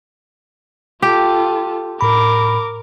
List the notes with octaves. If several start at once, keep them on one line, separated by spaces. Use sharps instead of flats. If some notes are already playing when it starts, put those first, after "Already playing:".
F4 G4 A4
A2 A#4 B5 D6